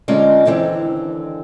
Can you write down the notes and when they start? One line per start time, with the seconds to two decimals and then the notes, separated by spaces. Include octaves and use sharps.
0.08 D3 G#3 C#4 D#4 F4 D5
0.45 D#2 D3 E3 C4